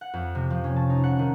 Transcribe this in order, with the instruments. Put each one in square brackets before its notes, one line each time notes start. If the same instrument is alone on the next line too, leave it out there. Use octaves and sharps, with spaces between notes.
[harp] F#5
F2
C3
F3
C#4
A5
D#4
F#5
D#3